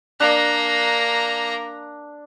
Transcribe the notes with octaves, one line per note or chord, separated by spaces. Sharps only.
A#3 D4 A#5